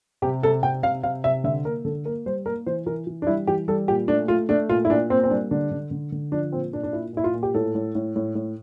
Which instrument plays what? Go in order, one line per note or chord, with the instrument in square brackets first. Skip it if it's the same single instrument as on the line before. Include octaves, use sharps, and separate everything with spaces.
[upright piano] C3 G4
C3 A4
C3 G5
C3 F5
C3 F5
C3 E5
D3 E5
A#3 A#4
D3 A4
A#3 A#4
G3 C5
A#3 A#4
E3 C5
E3 A#4
E3
D4
G3 E4
E3 G4
G3 A4
A#2 G4
A3 D4
A3 F4
A3 D4
A#2 F4
E4
A#2 D4
A#3 C4
C4
G3 D4
D3 D4
D3
D3
D3
F3 D4
A#2 C4
A#2 D4
D4
A#2 E4
A#2 E4
F4
A#2
G4
A2 A4
A2
A2
A2
A2